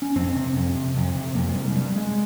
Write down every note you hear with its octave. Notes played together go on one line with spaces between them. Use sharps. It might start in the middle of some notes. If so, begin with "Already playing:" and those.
C#4
F2 C4
C3
F2
C3
F2
C3
F2 A#3
G#3
C3 G3
G2 G3
G#3